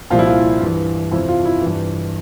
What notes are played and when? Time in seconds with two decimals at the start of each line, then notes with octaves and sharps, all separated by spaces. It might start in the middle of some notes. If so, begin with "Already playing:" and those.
0.10 C2 A#2 F3 F4
0.19 E4
0.26 F4
0.61 G2 E3
1.11 F2 C3 F3 E4
1.29 F4
1.45 E4
1.62 G2 E3